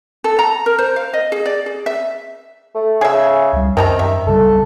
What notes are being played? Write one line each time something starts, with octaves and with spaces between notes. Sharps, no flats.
A4
A#5
A#4
C5
F5
D#5
G#4
D5
G#4
E5
A3
C#3 G#4 E5
C#2 G3
F#2 C3 D#3 D4 A#5
E5
B1 C#3 G3 A4